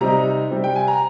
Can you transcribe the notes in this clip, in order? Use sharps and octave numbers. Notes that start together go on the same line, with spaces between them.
C3 G3 C4 D#4 A#5
C3 G3 C4
G5
G#5
A#5